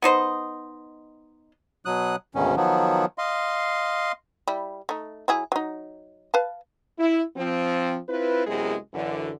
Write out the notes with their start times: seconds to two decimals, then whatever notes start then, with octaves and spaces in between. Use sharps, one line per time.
0.02 B3 D#4 C5 D#5
1.85 B2 F#3 D#6 F#6
2.35 D2 G#2 B2 D#3 C#4
2.56 D#3 F3 F#3 B3
3.18 D#5 F5 C6
4.47 G3 E4
4.89 A3 D#4
5.28 F#3 E4 G#4
5.52 F#3 D#4
6.34 B4 F5 A5
6.99 E4
7.36 F3 C4
8.09 C4 E4 F4 B4
8.47 F#2 C3 G#3 B3 E4 G#4
8.94 F#2 D3 E3